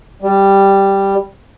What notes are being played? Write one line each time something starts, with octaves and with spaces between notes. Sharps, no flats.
G3